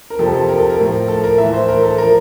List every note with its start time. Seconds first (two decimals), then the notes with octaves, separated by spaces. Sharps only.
0.10 A#4
0.19 F2 C3 F3 A4
0.34 A4
0.49 A#4
0.58 A4
0.69 A#4
0.79 A2 F3
1.08 A4
1.24 A#4
1.38 A2 E3 E5
1.53 C5
1.68 A#4
1.83 A4
1.98 F3 A#4